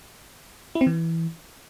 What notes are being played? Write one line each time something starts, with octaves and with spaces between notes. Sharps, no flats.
E4
C4
E3